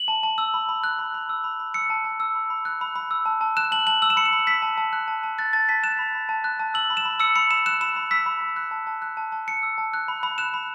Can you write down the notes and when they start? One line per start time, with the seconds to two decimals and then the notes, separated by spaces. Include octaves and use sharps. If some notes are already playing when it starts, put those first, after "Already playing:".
Already playing: F#7
0.08 A5
0.23 A5
0.38 E6
0.54 B5
0.69 B5
0.84 F#6
0.99 B5
1.14 B5
1.29 E6
1.44 B5
1.60 B5
1.74 E6 C#7
1.90 A5
2.05 A5
2.20 E6
2.35 B5
2.50 B5
2.65 F#6
2.81 B5
2.96 B5
3.11 E6
3.26 A5
3.41 A5
3.57 F#6 E7
3.72 A5 F#7
3.87 A5 F#7
4.02 E6 F#7
4.10 E7
4.16 B5 C#7
4.25 E7
4.33 B5
4.47 E6 B6
4.62 A5
4.78 A5
4.93 F#6
5.08 A5
5.24 A5
5.38 F#6 A6
5.53 A5 A6
5.69 A5 B6
5.83 F#6 E7
5.99 B5
6.15 B5
6.29 A5
6.44 F#6
6.60 A5
6.74 E6 F#7
6.90 B5
6.97 E7
7.05 B5
7.20 E6 C#7
7.36 B5 C#7
7.51 B5 E7
7.66 F#6 E7
7.81 B5 E7
7.96 B5
8.11 E6 B6
8.26 B5
8.41 B5
8.56 F#6
8.71 A5
8.87 A5
9.02 F#6
9.17 A5
9.32 A5
9.48 A5 C#7
9.63 E6
9.78 A5
9.94 F#6
10.08 B5
10.23 B5
10.38 F#6 E7
10.54 B5